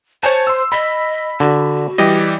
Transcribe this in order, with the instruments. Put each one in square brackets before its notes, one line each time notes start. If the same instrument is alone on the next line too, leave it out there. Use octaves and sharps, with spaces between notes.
[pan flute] C5 [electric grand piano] C#5 G#5 A5
[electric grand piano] C6 E6
[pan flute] D#5 [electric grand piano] B5 B6
[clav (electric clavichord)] D3 [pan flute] F#4
[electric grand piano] E3 G3 G4 [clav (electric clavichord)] D#5